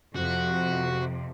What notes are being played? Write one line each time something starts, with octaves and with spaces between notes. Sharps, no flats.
F2 C3 F#4